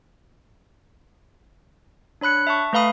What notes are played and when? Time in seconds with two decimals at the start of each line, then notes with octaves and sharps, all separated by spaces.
2.21 D4 C#5 B5 F#6 C#7
2.47 E5 A5 C#6
2.73 A3 B4 F5 B5 D#6